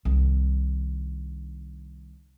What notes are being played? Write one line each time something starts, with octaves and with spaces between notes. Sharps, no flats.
C2 D#3